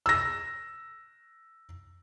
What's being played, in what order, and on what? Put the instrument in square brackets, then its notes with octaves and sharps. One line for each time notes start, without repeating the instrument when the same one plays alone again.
[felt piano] E6 A#6